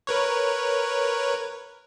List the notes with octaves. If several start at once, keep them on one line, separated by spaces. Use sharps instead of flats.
A#4 B4 C#5